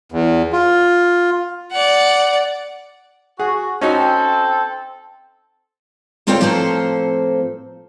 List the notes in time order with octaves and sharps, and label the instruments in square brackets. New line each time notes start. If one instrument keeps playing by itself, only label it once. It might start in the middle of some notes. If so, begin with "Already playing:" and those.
[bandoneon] E2
F4
[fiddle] D5 F#5
[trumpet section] F#4 [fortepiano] G#4
[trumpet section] C4 A4 G5 [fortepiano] C#4 D#4 F#4
[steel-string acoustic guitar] D2 C4 F4 A4 C#5 G5
A2 F3 A#3 C4 A4 C5